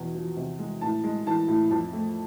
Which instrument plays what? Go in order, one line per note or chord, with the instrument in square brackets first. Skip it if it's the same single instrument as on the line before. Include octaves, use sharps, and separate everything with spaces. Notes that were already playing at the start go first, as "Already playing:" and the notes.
Already playing: [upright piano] E2 B2
F3
C3
G#3
A2 A5
G#3
E3 A5
A2
F2 A5
A3